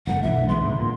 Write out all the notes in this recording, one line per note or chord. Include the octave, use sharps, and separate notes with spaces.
F#1 D3 A3 F#5
B1 E3 D4 E5
G#3 B3 C6
D1 C#2 G#2
A#2